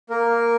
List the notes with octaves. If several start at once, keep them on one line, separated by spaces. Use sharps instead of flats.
A#3 A#4